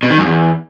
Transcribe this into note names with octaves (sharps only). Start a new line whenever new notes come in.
B2
D#3
F#2
E2